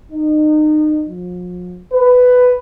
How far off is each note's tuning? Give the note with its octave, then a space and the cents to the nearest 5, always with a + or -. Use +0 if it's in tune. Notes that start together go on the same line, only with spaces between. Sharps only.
D#4 -30
F3 +40
B4 +10